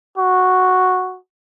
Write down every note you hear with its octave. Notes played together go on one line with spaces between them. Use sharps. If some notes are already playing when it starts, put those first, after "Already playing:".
F#4